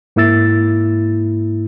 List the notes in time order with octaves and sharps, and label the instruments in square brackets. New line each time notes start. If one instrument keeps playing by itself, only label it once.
[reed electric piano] G#2 A#3 E4 E6 A6